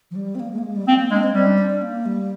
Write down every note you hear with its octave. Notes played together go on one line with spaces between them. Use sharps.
F3
G3
C4
A#3
G#3
A#3
G#3
G3
A#3 C4
A#3
G#3 D4
C4
G3 C4
D4
D4
D4
A#3
G3